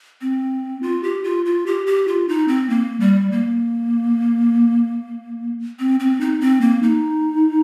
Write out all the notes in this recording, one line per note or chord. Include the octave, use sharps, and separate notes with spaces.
C4
F4
G4
F4
F4
G4
G4
F4
D#4
C4
A#3
G3
A#3
C4
C4
D#4
C4
A#3
D#4